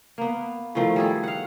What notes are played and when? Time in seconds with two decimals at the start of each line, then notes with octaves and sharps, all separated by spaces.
0.18 A#3 B3
0.75 A2 D#3 F3 A3
0.96 G3 G#4 A4
1.23 F5 F#5